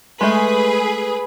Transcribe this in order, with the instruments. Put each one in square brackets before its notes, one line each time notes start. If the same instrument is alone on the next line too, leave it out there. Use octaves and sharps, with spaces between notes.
[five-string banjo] G#3 A3 [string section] G#4 B4